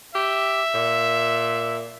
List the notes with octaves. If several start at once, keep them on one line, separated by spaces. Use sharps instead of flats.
G4 E5
A#2